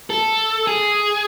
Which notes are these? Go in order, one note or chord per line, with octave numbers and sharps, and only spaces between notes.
A4
G#4